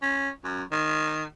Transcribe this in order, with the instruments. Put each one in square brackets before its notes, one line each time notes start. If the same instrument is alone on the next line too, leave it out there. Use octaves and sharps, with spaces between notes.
[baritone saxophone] C#4
F#2
D#3